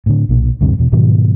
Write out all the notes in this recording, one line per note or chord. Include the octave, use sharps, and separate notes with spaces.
A2 D3
B1 A#2
D2 G2 C3
E2 B2
G#2 B2 D#3 F#3